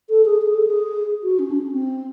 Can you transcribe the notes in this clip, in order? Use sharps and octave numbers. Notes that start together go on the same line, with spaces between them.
A4
G#4
G#4
A4
G#4
F#4
C#4
D4
C#4
C4